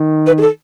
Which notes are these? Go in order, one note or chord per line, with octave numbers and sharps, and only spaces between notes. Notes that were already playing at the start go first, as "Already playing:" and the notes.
Already playing: D#3
B4
G#4
A4